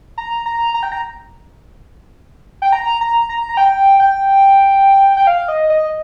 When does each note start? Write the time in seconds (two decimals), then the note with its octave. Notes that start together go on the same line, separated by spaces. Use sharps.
0.18 A#5
0.46 A#5
0.74 A#5
0.83 G5
0.92 A#5
2.62 G5
2.72 A#5
3.01 A#5
3.29 A#5
3.49 A#5
3.57 G5
4.00 G5
5.17 G5
5.27 F5
5.48 D#5
5.70 D#5